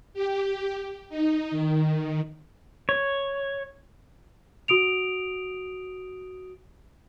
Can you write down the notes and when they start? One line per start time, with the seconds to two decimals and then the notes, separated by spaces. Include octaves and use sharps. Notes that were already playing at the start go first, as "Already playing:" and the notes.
0.14 G4
1.09 D#4
1.51 D#3
2.89 C#5
4.68 F#4 D#6 D7 F7